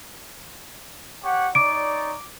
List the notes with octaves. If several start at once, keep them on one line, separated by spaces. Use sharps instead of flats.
G4 C#5 F#5
D#4 C#5 D5 D6 D7